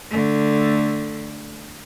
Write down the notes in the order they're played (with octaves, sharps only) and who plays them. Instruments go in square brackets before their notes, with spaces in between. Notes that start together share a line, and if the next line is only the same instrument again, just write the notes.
[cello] D3 A3